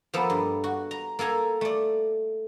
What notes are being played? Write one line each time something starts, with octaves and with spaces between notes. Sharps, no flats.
F3 A#3 B3 A4
G2
F#4
A#5
A#3 A4 G#5 A#5
A3 D5